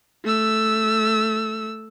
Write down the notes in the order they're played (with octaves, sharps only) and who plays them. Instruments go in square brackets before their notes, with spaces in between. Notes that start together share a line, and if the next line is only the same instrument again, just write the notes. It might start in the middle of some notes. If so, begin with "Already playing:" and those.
[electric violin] A3 E6